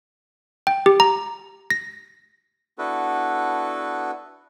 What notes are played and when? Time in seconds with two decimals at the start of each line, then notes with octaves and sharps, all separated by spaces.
0.67 G5
0.86 G4
1.00 A#5
1.70 A#6
2.78 B3 D4 E4 F#4 A4 B4